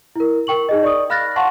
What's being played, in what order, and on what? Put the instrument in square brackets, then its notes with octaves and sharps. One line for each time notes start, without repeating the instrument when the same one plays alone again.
[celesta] E4 A#4
A#4 G5 C#6 F#7
D#4 G#4 D#5
D5 C#6 D#6
F5 B5 F6 F#6 A6 A#6
F5 F#5 A5 C6 C#6